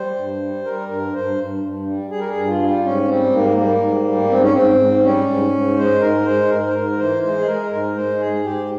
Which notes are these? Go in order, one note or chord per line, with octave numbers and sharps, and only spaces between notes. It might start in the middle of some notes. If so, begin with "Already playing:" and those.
Already playing: G3 C5
G2
G3
G3 A#4
G2 A#4
G2 C5
G2
G2
G3
G3 G#4
A#4
G#4
G2
F4
G3
G#2 C#4
G3 C4
G#2 A#3
G3 A#3
G#2
G3
G#2 C4
C#4
G#2 C4
G#2
G3 C#4
G#2
G#2
G#3 C5
G#2 A#4
G#3 C5
G#2 A#4
C5
G#2 A#4
E3 C5
G#3 C5
G#4
G#3 A#4
G#2 A#4
G#3 C5
G#2 G#4
G#2 G4